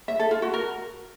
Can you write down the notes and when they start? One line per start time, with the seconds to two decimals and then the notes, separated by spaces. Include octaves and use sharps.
0.08 E5
0.20 A4
0.31 F4
0.42 F#4
0.54 A#4